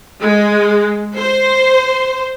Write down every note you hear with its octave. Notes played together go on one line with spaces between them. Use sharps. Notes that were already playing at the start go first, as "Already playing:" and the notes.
G#3
C5